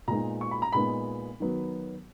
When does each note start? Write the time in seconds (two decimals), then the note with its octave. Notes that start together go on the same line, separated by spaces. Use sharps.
0.08 A#2 G#3 B3 D#4 A#5
0.41 C#6
0.51 B5
0.62 A#5
0.73 A#2 G#3 B3 D#4 B5
1.40 D#3 F#3 B3